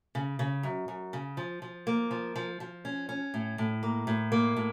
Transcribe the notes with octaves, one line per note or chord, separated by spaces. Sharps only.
C#3
C#3
F#2
F#2
C#3
F3
F3
A#3
F3
F3
F3
C#4
C#4
A2
A2
A#3
A2
A#3
A2